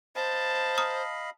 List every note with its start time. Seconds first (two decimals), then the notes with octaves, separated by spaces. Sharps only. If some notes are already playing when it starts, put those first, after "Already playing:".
0.16 C5 D#5 F5 A5 B5
0.78 A#5 D#6 F6